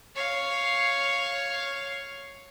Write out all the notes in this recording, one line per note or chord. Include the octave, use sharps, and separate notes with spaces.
C#5 F5